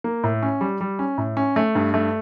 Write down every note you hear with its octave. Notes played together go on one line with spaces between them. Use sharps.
A#3
A2
C#4
G3
G3
C#4
A2
C#4
A3
G2
A3